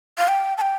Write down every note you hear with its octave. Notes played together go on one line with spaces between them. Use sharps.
F5
G5
A5
G5